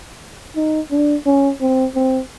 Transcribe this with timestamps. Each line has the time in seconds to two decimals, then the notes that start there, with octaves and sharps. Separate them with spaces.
0.56 D#4
0.91 D4
1.26 C#4
1.61 C4
1.95 C4